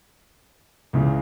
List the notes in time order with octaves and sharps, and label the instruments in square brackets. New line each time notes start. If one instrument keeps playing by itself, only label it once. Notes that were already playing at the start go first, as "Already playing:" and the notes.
[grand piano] C#2 C#3 E3